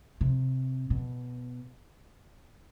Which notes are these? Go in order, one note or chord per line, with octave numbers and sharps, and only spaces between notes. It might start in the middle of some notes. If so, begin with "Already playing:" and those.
C3
B2